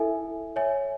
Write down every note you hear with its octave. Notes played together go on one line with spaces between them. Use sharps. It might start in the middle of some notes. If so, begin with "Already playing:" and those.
Already playing: E4 A4 E5 G#5
C#5 E5 G#5